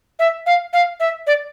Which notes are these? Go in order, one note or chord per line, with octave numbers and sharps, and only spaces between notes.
E5
F5
F5
E5
D5